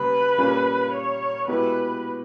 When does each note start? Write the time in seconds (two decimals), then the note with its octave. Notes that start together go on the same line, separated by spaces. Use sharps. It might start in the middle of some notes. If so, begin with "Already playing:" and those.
Already playing: C#3 G3 A#3 B4
0.38 A#2 G3 A#3 C#4
0.93 C#5
1.48 B2 G#3 B3 E4 G4 B4